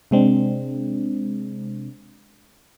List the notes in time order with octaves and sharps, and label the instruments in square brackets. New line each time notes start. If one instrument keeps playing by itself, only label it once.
[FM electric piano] C3 G#3 C4 D4